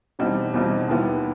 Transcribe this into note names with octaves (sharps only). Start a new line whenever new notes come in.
E2 B2 G3 C4 D#4
E2 B2 G3 C4 D#4
D#2 D#3 G3 B3 E4